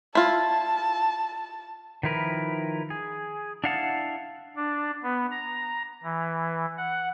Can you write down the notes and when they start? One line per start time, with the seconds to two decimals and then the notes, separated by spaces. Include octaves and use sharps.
0.15 E4 F4 A5
2.03 D#3 F3 E4 A#4 B4
2.90 G#4
3.64 D4 E4 F5 F#5 A5
4.56 D4
5.03 B3
5.31 A#5
6.04 E3
6.77 F#5